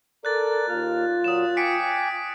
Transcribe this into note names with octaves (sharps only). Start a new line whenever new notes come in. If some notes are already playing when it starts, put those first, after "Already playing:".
A4 A#4 D5 F#6 A6
D#2 A#3 F4 F6
A#2 F#3 D#6 E7
G5 G#5 D6 B6 C#7 D7